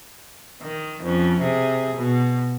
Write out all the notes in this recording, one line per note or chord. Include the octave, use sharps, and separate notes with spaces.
D#3
F2 C#4
C3 G#4
B2